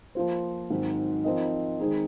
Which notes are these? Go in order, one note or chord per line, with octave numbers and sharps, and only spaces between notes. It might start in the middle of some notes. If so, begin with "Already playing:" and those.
F3 A#3 F4 C5
G#2 D#3 F#3 C4
F3 C4 D#4 A#4 D#5
D#3 G#3 C4 D#4 G#4